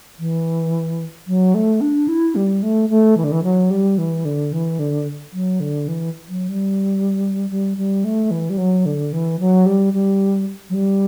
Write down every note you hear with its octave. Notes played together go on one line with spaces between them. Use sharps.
E3
F#3
A3
D4
E4
G3
A3
A3
E3
D3
E3
F#3
G3
E3
D3
E3
D3
F#3
D3
E3
F#3
G3
G3
G3
A3
E3
G3
F#3
D3
E3
F#3
G3
G3
F#3
G3